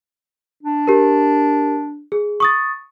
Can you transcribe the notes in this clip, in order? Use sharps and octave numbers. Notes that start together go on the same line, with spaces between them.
D4
G4 A#4
G#4
C#6 D#6 A6